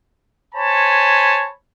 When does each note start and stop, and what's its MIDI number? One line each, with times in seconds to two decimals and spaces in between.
0.55 1.48 72
0.55 1.48 73
0.55 1.48 80
0.55 1.48 81
0.55 1.48 83